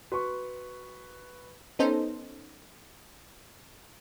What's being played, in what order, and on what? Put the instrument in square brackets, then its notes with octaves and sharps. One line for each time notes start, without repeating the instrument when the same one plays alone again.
[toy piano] F#4 [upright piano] B4 C#6
[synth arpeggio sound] B3 C#4 D#4 A4 C5